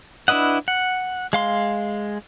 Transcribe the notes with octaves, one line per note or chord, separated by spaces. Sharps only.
D4 E4 B4 D#5 F#5
F#5
G#3 F5 C6